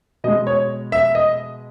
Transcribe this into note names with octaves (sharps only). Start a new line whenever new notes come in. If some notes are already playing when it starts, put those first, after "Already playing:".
B2 G#3 D#5
C#5
E5
D#5